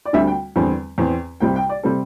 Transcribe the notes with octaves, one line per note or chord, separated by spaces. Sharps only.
D5
D2 D3 G3 C4 E5
G5
E2 D3 G3 C4
E2 E3 C4
C2 C3 G3 C4 G5
G5
D5
C3 G3 C4 A4